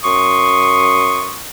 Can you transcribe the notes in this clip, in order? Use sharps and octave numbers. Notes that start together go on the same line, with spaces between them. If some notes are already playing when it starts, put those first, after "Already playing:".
F#2 C6 C#6 D#6